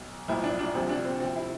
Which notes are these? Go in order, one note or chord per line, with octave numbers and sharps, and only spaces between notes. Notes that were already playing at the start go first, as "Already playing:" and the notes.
Already playing: B1
B1 A2 F3 E4
D4
D4
D2 C3 F3 C4
D4
C4
D2 C3 F3 C4
E4